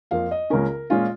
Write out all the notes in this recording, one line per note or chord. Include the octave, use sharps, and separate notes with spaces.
F2 F3 A#3 F5
D#5
C#2 C#3 A#3 C#4 A#4
A#2 G#3 C#4 F4